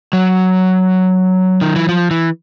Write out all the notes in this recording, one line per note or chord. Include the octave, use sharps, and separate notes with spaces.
F#3
D#3
E3
F3
E3